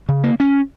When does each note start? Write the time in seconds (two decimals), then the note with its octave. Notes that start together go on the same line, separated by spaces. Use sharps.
0.09 C#3
0.24 A#3
0.40 C#4